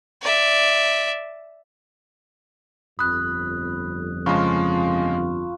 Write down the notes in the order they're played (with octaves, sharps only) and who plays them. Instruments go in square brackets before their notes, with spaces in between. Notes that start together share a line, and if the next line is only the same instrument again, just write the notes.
[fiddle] D5 E5
[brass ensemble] G1 F2 [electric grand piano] B5 [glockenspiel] D#6 F#6
[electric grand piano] C#3 F3 G#3 [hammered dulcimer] F4 A5 B5 [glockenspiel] C#6